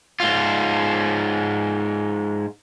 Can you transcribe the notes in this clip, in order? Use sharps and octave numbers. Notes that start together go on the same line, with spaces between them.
G#2 F4